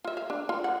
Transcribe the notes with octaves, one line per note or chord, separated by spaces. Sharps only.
F4 E5
F5
D4
F4
F#5